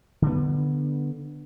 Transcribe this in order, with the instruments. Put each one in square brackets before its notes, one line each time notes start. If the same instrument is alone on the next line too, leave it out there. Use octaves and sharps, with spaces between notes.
[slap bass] D3 B3